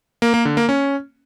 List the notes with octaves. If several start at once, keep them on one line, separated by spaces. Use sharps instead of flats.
A#3
A#3
D3
A#3
C#4